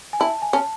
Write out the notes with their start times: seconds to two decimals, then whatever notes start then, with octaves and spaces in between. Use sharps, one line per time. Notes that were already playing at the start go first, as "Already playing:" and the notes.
0.13 G#5
0.20 E4 A5
0.42 G#5
0.53 C#4 A5